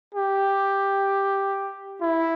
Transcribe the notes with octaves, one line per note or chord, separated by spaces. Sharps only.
G4
E4